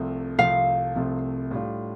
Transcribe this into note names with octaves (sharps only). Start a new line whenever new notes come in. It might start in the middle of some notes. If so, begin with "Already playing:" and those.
Already playing: C2 C3 F3 A3
C2 C3 F3 A3 F5
C2 C3 F3 A3
A2 G3 D4 F4